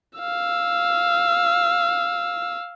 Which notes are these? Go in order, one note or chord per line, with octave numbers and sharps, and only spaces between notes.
F5 E6